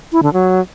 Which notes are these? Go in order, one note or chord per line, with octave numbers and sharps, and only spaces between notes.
E4
D3
F#3